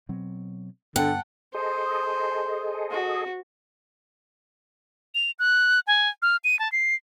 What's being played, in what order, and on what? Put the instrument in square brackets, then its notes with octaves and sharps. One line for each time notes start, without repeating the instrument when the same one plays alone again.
[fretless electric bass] B2 F#3 C4
[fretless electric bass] G2 G3 B3 [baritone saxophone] D3 [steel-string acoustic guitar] F#5 [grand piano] G5 A5
[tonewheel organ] G#4 A4 D#5 [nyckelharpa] C5
[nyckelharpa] F#4
[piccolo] F7
F#6
G#5
F6
D#7
A5
C7